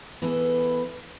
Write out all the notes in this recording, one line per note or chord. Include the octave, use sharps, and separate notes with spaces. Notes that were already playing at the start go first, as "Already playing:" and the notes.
E3 B3 E4 G#4 A4